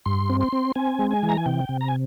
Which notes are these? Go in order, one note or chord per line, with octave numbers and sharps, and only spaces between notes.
G2 C6
C4
C6
C4
C4 G#5
G#3
G#5
E3
A#5
G#5
C3 G5
C3
A#5
G#5